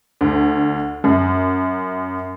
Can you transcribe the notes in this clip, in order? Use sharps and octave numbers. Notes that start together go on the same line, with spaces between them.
D2
F#2